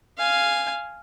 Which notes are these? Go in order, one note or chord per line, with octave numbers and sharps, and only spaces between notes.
F5 G#5